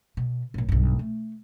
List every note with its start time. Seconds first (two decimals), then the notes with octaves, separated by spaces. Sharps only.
0.17 B2
0.54 B1 A#2
0.69 B1 G2
0.99 A3